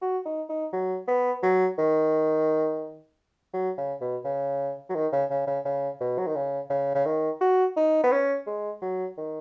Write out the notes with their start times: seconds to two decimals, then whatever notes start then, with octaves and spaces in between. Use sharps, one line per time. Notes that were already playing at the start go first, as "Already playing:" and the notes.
0.02 F#4
0.25 D#4
0.49 D#4
0.73 F#3
1.08 B3
1.43 F#3
1.78 D#3
3.54 F#3
3.78 C#3
4.01 B2
4.25 C#3
4.90 F#3
4.95 D#3
5.13 C#3
5.30 C#3
5.47 C#3
5.65 C#3
6.00 B2
6.18 F#3
6.27 D#3
6.36 C#3
6.70 C#3
6.95 C#3
7.06 D#3
7.41 F#4
7.77 D#4
8.04 B3
8.12 C#4
8.47 G#3
8.82 F#3
9.18 D#3